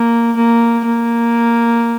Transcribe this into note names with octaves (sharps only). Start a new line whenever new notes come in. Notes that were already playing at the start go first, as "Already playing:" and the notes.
Already playing: A#3
A#3
A#3